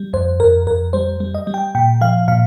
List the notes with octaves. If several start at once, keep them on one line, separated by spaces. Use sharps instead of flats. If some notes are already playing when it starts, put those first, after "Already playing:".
Already playing: G3
F2 C5
F2 A#4
F2 A#4
G3 C5
G3
D#5
G3
G5
A#2 G5
F3 F5
A#2 F5